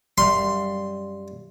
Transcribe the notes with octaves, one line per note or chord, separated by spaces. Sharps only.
F#2 G3 F5 C6